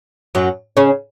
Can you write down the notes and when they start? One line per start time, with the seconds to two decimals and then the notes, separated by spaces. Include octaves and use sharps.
0.35 F#2 F#3
0.77 C#3 C#4